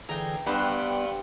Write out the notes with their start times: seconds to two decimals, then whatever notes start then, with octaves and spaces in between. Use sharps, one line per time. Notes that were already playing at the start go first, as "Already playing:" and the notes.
0.09 D3 E3 G#4 G5 A#5
0.46 G2 B3 G4 B4 C5 F#5